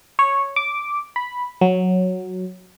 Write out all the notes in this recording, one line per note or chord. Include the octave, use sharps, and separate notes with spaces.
C#5
D6
B5
F#3